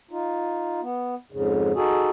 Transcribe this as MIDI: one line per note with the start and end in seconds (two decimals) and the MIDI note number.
0.11 0.81 63
0.11 0.81 65
0.82 1.15 59
1.32 1.72 41
1.32 1.72 44
1.32 1.72 49
1.75 2.10 63
1.75 2.10 66
1.75 2.10 68
1.75 2.10 69